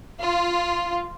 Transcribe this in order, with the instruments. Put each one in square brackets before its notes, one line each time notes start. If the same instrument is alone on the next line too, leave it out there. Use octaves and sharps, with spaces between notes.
[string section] F4